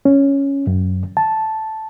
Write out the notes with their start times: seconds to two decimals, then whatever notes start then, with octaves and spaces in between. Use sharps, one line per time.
0.05 C#4
0.67 F#2
1.17 A5